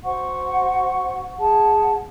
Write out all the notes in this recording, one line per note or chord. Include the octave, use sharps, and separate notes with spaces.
F#4 C5 F#5 C#6
G#4 F#5 A5